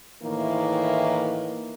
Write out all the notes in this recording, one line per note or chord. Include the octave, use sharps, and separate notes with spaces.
A2 D#3 E3 A#3